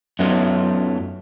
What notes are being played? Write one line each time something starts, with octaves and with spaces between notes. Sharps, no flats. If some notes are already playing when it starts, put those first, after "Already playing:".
F#2 F#3 A3 B3 D#4 F4